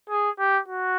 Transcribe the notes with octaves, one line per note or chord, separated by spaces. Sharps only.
G#4
G4
F#4